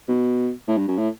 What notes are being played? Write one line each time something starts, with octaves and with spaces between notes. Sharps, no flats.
B2
A2
G2
F#2
A2